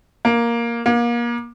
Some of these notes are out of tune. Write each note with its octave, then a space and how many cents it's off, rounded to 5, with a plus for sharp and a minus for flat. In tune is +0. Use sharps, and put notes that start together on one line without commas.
A#3 +5
A#3 +30